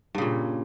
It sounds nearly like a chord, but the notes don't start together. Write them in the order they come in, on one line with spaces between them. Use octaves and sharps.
G2 C#3 A#2